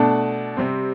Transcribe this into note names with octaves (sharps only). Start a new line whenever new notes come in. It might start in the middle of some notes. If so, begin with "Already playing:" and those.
Already playing: B2 A3 D4 A4
C3 G3 C4